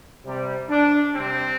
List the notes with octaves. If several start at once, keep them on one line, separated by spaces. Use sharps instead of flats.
C3 G3
D4
C3 G3 C4